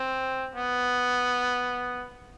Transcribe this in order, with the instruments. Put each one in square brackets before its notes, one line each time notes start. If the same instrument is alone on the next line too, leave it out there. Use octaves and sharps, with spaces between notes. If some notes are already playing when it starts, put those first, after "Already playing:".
Already playing: [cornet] C4
B3